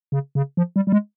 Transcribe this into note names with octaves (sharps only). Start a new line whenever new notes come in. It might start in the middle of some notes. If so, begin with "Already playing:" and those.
C#3
C#3
F3
G3
G3
G#3